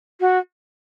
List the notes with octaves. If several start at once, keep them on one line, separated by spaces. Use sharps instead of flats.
F#4